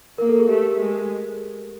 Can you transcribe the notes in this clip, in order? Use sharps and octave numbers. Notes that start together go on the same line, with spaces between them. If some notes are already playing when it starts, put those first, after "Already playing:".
A#3 A#4
A4
G#4
A3 G4
G#3